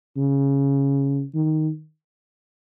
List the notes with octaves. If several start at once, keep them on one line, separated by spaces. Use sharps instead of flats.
C#3
D#3